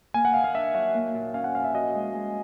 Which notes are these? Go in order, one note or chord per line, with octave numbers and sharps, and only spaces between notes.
A#3 G#5
F#5
D#3 F5
F5
D4 E5
F#3 E5
A#3
A#2
C#4 F5
F#5
F3 F5
E5
F#4 D#5
G#3
G#3